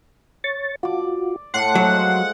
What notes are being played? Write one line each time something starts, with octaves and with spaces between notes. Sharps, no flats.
C#5 C#6 A6
F4 F#4 D5 D6
A2 F#5 G5 C6 D6
F3 F#3 G#3